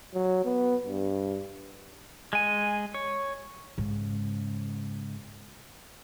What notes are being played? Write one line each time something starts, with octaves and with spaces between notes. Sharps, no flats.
F#3
B3
G2
G#3 G#5
C#5
G#2 C#3